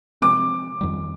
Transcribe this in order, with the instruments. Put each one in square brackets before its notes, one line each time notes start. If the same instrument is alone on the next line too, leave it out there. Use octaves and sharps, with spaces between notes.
[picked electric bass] C3 F3 G#3 C4 [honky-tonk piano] D6
[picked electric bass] F2 D#3 G3